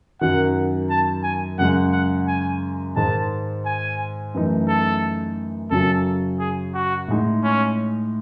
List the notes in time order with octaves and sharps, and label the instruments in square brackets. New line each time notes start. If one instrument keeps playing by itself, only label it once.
[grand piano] F#2 D#3 F#3 [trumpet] F#5
[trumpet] A5
G#5
[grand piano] F#2 C#3 G#3 [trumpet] F#5
[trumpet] F#5
G#5
[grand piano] G#2 D#3 G#3 [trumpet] A5
[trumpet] G#5
[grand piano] F#2 E3 A3 D#4
[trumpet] A4
[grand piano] F#2 C#3 F#3 C#4 [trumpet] A4
[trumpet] G#4
F#4
[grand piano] A2 G#3 D#4
[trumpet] C#4